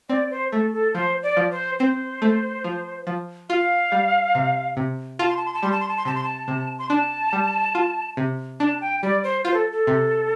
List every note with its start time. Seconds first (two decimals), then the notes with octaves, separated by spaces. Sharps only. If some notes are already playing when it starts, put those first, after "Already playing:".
0.09 C4 D5
0.30 C5
0.52 A3 A4
0.73 A4
0.94 F3 C5
1.23 D5
1.37 F3
1.51 C5
1.79 C4 C5
2.22 A3
2.64 F3
3.07 F3
3.50 F4 F5
3.92 G3
4.35 C3
4.77 C3
5.19 F4 A5
5.28 C6
5.37 A5
5.46 C6
5.54 A5
5.63 G3 C6
5.72 A5
5.80 C6
5.88 A5
5.97 C6
6.05 C3 A5
6.15 C6
6.23 A5
6.48 C3
6.79 C6
6.90 D4 A5
7.33 G3
7.75 F4
8.17 C3
8.60 D4 A5
8.81 G5
9.02 G3 D5
9.24 C5
9.45 F4 C5
9.54 A4
9.72 A4
9.87 C3